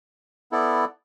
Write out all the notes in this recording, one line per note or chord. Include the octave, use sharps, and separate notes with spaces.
B3 E4 A4 D5